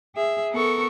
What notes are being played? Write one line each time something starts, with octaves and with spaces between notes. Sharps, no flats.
G#4 E5
B3 A4 A#4 C#6